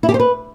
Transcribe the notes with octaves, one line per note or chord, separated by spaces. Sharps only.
E4
G4
C5
B4